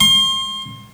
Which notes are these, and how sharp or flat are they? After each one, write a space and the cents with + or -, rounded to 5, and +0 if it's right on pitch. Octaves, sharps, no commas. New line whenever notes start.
C6 +30